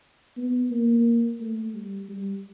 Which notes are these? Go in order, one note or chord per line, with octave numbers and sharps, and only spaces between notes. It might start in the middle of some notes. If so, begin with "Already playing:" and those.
B3
A#3
A3
G3
G3